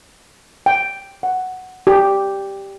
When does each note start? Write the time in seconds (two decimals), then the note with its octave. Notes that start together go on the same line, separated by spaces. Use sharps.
0.66 G5
1.23 F#5
1.87 G4